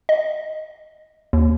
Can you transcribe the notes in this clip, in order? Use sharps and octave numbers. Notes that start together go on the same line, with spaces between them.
D#5
D#2